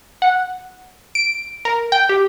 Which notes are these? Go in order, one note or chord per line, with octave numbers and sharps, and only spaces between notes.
F#5
D7
A#4
G5
G4